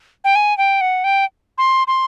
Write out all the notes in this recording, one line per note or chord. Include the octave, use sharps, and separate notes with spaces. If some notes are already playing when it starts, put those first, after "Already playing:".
G5
G#5
G5
F#5
G5
C6
C6